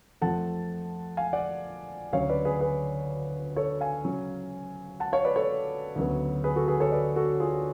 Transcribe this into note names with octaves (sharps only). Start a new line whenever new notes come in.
F2 F3 A3 F#5 A5
F5 G#5
D5 F#5
D2 C#3 F#3 C#5 F5
B4 D5
G#4 B4
G#4 B4
A4 C#5
F5 G#5
C#3 F#3 C#4
F#5 A5
C#5 F5
B4 D5
A4 C#5
D2 C#3 F#3 B3
G#4 B4
F#4 A4
G#4 B4
A4 C#5
B4 D5
F#4 A4
F4 G#4